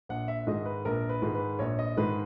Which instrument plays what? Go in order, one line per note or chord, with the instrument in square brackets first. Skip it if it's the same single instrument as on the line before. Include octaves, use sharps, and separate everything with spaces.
[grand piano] A#1 F#5
E5
G#2 D#3 G#3 D#5
B4
A#1 A#4
B4
G#2 D#3 G#3
B4
A#1 C#5
D#5
G#2 D#3 G#3 B4